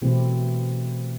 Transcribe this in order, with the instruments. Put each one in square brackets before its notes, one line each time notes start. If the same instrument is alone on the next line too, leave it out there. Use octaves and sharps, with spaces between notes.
[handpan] B2 E3 A3 C4 E4 G4